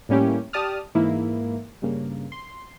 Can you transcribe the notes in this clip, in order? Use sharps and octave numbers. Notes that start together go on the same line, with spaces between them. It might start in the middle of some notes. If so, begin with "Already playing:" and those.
A2 G3 A#3 C#4 E4 G4
G4 D5 A5 D#6 F6
G#2 E3 A#3 E4
G2 C#3 A#3
C6